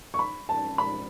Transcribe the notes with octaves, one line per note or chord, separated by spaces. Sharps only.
C#6
B5
A5
B5